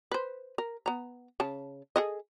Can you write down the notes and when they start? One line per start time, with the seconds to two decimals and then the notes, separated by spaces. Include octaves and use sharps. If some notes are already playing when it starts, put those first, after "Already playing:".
0.11 B4 C5
0.58 A#4
0.86 B3 A#5
1.40 C#3 A5
1.96 G#4 A4 D#5